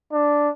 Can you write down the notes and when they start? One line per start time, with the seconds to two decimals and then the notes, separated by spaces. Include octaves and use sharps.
0.13 D4